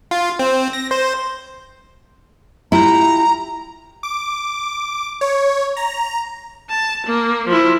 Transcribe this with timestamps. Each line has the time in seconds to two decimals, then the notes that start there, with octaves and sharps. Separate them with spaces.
0.11 F4
0.39 C4
0.73 A#6
0.91 C5
2.72 E4 F4 G4 A#5
4.03 D6
5.21 C#5
5.77 A#5
6.70 A5
7.06 A#3
7.47 F3 E4